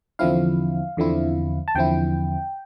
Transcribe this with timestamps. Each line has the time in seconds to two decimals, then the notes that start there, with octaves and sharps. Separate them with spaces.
0.19 E2 D3 F3 C4 E4 F5
0.97 E2 D3 F3 C4 E4
1.68 A5
1.75 E2 D3 F3 C4 E4 G5